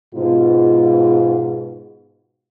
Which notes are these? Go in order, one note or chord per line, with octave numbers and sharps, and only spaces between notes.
G#2 B2 F4